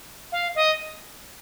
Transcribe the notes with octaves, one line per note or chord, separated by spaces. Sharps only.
F5
D#5